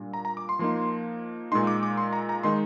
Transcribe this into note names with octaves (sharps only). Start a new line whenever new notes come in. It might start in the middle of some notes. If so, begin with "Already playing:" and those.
Already playing: A#2 G3 D4
A#5
A#5
D6
C6
F3 A#3 D#4 C6
A#2 G#3 D#4 C6
D6
D6
C6
A#5
A#5
D#3 G#3 D#4 C6